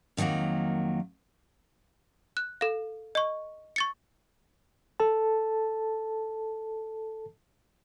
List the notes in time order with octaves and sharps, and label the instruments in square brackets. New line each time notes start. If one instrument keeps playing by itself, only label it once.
[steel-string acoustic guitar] F2 D#3 F#3 A#3 F#5
[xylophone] F#6
A4 F5
D#5 C#6
C#6 A6 C#7
[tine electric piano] A4 A5